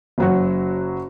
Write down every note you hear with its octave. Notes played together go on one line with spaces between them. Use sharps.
F#1 F#3 F#4